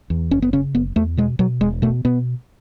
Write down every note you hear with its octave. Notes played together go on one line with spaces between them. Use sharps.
E2
F#1 C#4
B3
C#3 C#4
F#1 B3
E2 A3
B2 G#3
B2 F#3
E1 G#3
B2 A3
B2 B3